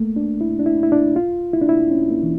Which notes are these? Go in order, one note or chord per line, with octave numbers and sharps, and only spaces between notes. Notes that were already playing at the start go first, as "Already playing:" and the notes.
Already playing: A3 A#3
D4
E4
D4
E4
E4
D4
F4
E4
D4
E4
C#4
A#3
E3